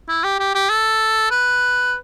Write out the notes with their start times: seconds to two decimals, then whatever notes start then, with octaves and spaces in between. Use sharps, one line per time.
0.09 E4
0.24 G4
0.40 G4
0.55 G4
0.70 A4
1.31 B4